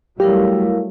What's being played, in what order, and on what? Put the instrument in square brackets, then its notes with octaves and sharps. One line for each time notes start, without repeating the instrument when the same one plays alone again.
[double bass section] F#3 G3 A3 [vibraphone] E4 A#4 F5 [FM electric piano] G4